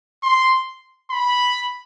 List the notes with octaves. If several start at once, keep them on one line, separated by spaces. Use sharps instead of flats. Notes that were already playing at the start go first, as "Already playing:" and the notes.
C6
B5